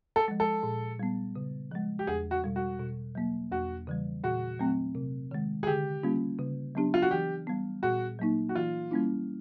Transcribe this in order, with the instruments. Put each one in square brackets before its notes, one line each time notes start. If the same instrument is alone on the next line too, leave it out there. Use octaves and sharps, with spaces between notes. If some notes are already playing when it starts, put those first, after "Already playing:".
[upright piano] A4
[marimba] F3 G#3
[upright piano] A4
[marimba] A#2
G3 B3
C#3
F3 G#3
[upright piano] G4
[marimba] E2 [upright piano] G#4
[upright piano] F#4
[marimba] B2 G3
[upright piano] F#4
[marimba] B2
F#3 A#3
[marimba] E2 [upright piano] F#4
[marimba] C#3 E3 G3
[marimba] A#2 [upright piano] F#4
[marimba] F#3 A3 C4
C3
D#3 G#3
[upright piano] G#4
[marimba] D3 [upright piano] G4
[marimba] G3 A#3 C#4 F4
C#3
F#3 B3 D4 G4
[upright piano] F4
F#4
[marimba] E3 [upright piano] G4
[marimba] G3 B3
[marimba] A#2 [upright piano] F#4
[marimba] F#3 A#3 D#4
[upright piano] F#4
[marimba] E3 [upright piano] F4
[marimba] G3 A#3 C#4 E4